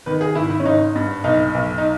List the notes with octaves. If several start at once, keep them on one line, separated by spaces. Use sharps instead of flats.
D#3 B4
G#4
G#1 E4
E4
C#4
G#1 D#4
G2
B1 D#4
B1
D#4